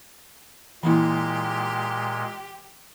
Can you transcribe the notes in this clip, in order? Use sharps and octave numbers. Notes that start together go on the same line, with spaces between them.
A#2 E3 G#3 A#3 E4 G4